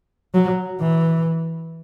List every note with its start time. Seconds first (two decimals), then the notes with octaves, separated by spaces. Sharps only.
0.34 F#3
0.80 E3